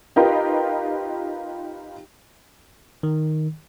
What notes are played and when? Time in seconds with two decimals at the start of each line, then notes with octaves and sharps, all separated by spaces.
0.16 D#4 F4 G4 A#4 B4
3.03 D#3